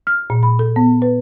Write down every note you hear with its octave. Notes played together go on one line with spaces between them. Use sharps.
F6
A#2
B5
A4
B3
B4